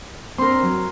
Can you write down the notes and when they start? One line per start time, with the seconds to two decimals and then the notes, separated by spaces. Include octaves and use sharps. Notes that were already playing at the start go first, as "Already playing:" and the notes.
0.38 C4 D4 A#4 C6
0.63 F#3